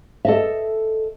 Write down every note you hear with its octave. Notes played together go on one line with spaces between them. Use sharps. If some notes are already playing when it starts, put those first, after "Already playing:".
A4 D#5 E5